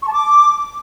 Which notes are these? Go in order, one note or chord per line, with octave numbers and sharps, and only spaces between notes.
C#6
A5
D6